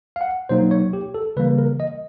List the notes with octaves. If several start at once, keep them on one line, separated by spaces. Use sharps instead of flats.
F5
F#5
B2 F#3 A#3 D#4 C5
C#5
G4
A4
C#3 E3 G3 A#3 B4
A#4
D#5